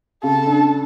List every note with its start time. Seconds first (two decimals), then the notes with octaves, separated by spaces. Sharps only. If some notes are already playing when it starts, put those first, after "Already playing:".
0.23 C#3 A4
0.47 D4